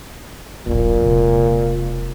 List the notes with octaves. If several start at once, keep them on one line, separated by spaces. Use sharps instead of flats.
D#1 A#1 A#2
E1 C3